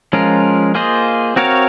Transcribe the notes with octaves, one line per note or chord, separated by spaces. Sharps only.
F3 G#3 C#4 F4 A#4
A#3 F4 G#4 C5 D#5
C4 F#4 A#4 C#5 F5